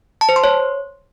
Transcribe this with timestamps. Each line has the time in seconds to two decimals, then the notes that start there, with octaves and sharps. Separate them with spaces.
0.21 A5
0.29 C5
0.36 C6
0.44 C#5